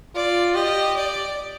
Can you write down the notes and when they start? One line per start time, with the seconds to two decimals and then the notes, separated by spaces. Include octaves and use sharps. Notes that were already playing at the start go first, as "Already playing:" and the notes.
0.15 F4 D5
0.55 G4 D#5
0.96 D5